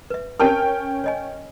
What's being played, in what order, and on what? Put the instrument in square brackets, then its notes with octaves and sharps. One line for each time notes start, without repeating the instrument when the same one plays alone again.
[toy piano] B4 E5
[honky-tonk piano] C#4 G5 F6 [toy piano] A#4 A5
[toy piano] C#5 D#5 G#5